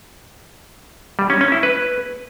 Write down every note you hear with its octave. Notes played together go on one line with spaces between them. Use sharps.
G3
C#4
C#4
E4
B4